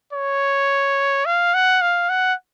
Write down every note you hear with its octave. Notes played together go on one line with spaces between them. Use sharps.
C#5
F5
F#5
F5
F#5